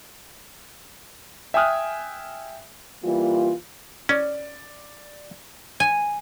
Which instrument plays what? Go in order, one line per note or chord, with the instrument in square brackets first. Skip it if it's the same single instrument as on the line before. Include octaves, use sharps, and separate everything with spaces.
[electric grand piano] E5 G5 G#5 D#6 F6 F#6
[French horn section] E3 G3 A#3 F4
[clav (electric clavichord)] C#4 [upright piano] D5
[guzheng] G#5